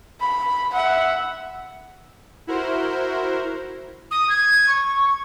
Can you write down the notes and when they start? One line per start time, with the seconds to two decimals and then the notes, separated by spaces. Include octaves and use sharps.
0.20 B5
0.74 E5 F#5
2.47 E4 F#4 A#4 C5
4.11 D#6
4.29 G#6
4.67 C#6